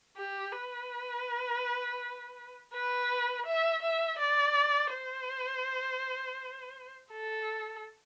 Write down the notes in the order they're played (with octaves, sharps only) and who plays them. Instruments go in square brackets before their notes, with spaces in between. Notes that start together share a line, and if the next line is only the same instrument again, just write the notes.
[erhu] G4
B4
B4
E5
E5
D5
C5
A4